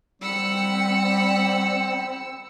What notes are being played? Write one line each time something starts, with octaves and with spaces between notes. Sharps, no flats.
G3 C4 F#5 B5 E6 C#7